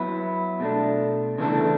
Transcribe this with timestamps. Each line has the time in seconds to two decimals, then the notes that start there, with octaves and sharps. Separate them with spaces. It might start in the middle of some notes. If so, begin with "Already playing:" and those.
Already playing: F#3 B3 E4
0.60 B2 A3 D4
1.38 C#3 E3 A3 D4 A4